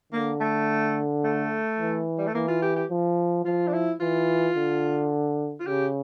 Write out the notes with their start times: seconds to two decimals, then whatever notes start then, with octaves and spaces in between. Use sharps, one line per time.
0.13 D3 A#3
0.40 A3
1.24 A3
1.79 E3
2.18 G3
2.27 A3
2.34 E3 A#3
2.48 F4
2.62 G4
2.76 G4
2.90 F3
3.45 F3 F4
3.67 D4
3.73 E4
4.00 E3 F4
4.56 D3
5.60 F4
5.66 C#3 G4